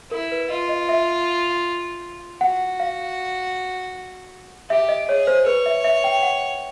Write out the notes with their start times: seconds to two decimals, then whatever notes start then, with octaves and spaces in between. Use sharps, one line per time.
0.11 E4 A#4
0.32 B4
0.50 F4 D#5
0.69 D#5
0.89 E5
2.40 F#4 F#5
2.80 F5
4.70 G4 E5
4.89 D#5
5.08 G#4 C#5
5.27 C5
5.46 B4 C#5
5.66 E5
5.84 E5
6.04 G5
6.22 F#5